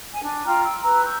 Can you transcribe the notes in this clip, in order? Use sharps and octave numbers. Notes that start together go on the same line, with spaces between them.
G#5
D4
F4 G5 A#5 F6
E6
B4 A#5 E6
C#6 E6 G6